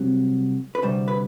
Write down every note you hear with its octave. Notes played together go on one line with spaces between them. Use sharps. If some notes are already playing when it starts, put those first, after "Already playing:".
Already playing: C2 C3 F#3
B4
D2 C3 G3 C5
B4